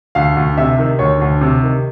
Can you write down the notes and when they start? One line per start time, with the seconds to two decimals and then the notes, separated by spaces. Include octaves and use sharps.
0.15 D2 F5
0.36 D2
0.58 C3 E5
0.79 D#3
0.99 D2 C#5
1.21 D2
1.41 C3
1.63 D#3